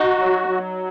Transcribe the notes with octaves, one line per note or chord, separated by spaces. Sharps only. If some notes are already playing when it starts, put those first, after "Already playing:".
Already playing: D#4 F#4
F#3
F#3